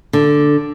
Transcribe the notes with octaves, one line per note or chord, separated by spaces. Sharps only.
D3